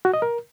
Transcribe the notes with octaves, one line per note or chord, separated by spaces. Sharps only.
F#4
D#5
A#4